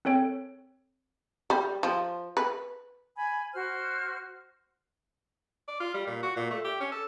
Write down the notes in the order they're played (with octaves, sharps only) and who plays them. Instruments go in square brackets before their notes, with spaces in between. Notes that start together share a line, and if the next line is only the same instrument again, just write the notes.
[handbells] C4 A4 C#5 G5
[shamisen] G3
F3
B4
[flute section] G#5 B5
F#4 C5 F6
[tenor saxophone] D5
F4
G3
A#2
F#4
A#2
A3
G4
C#4
A4